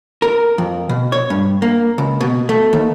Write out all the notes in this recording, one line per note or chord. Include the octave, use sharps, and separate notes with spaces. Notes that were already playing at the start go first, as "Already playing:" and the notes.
A#4
F2
B2
C#5
G2
A#3
C#2
B2
A3
D#2